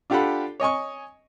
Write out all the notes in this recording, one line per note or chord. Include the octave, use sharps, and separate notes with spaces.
D4 F4 G4 A4 F#5 B5
C#5 D#5 G#5 C#6